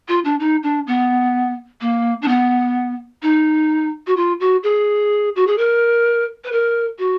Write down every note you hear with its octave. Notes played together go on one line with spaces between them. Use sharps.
F4
D4
D#4
D4
B3
A#3
D4
B3
D#4
F#4
F4
F#4
G#4
F#4
G#4
A#4
B4
A#4
F#4